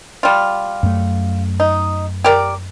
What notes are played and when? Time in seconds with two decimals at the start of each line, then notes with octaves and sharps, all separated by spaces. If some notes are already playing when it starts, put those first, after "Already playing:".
0.23 G3 F4
0.83 F#2 A3
1.60 D#4
2.24 G4 A#4 D5